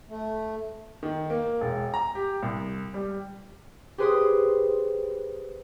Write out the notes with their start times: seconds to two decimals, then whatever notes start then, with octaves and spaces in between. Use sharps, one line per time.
0.09 A3
1.03 D#3
1.30 A#3
1.61 E1
1.94 A#5
2.15 G4
2.43 C2
2.94 G3
3.98 G4 G#4 B4 C5 C6 D#6